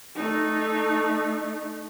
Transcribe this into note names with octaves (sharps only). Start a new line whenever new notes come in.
A3 D#4